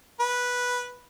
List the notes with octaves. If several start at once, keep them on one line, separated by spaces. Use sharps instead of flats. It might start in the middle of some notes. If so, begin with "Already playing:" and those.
B4